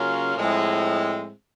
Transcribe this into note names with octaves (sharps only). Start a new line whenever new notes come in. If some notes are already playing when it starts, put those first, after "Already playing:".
Already playing: C#3 F#3 A#3 C#4 F4
A2 F3 G#3 C4 E4